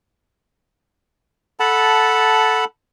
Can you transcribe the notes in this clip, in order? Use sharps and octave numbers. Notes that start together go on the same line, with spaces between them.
A4 F#5 A5 B5